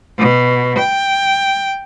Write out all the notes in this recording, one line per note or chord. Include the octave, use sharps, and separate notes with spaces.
B2
G5